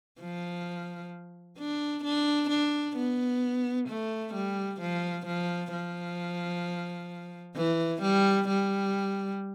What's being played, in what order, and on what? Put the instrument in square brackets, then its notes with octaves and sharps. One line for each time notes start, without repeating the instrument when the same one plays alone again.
[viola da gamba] F3
D4
D4
D4
B3
A3
G3
F3
F3
F3
E3
G3
G3